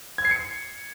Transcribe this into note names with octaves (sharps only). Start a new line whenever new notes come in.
G#6
C7
C#7